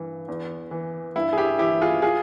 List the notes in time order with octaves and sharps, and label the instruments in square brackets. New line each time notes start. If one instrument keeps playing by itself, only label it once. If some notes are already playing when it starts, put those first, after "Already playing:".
Already playing: [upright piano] G2 E3
E2
E3
G2 E4
G#4
E4 G4
E3 E4 G4
F4 G#4
F4 G#4